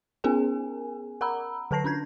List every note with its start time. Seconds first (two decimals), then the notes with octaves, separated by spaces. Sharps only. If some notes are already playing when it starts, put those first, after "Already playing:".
0.24 B3 C#4 G#4 A#4 G#5
1.21 A#4 F#5 A#5 B5 E6
1.71 D3 A4 B4 A5 A#6 C7
1.84 C#4 D4 G6 G#6